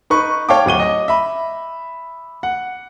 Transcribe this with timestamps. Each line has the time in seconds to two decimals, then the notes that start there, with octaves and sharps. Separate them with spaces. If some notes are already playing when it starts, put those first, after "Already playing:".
0.10 D#4 B4 C#6
0.49 C#5 F5 G5 A5 C#6 D6
0.66 D1 F#5 D#7 G7
0.80 D#5
1.08 E5 B5
2.43 F#5